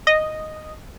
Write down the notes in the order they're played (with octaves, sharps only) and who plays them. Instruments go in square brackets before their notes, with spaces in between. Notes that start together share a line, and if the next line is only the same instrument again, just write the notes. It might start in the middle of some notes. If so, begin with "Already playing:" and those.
[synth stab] D#5